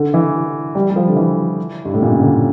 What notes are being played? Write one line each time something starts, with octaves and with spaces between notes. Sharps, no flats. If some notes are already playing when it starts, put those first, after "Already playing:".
Already playing: D3
E3
G3
G3
F3
D3
E3
G2
A2
A#2
C#3
D3